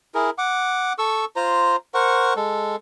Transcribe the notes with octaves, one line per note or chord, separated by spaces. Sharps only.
E4 G#4 A#4
F#5 D6
A4 C#6 E6
F4 C5 A#5
A#4 C5 F#5 C#6
G#3 A4